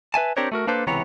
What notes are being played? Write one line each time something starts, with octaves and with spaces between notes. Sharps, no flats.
B4 E5 G#5 A5
C4 D4 G4 A#4 C5 C#5
A3 F#4 A#4
A#3 D4 A4 B4 C5
C#2 C3 E3 B3 C#5 A#5